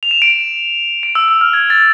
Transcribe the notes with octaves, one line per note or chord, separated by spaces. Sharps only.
F7
E7
D7
E7
D7
E6
E6
F6
G#6
A6